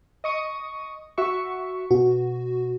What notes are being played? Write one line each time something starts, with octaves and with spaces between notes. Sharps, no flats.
D#5 C#6 D#6
F#4 E5 C#6
B2 F#4